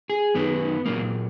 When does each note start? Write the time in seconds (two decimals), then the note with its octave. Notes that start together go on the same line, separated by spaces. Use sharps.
0.10 G#4
0.35 F#2 D#3 F#3 B3
0.86 A#2 F#3 A#3